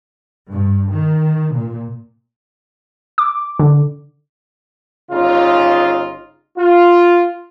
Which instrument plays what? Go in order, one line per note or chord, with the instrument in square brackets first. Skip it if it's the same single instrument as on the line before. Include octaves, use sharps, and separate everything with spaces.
[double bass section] G2
D#3
A#2
[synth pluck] D6
D3
[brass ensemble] G1 C#3 D#4 F4
F4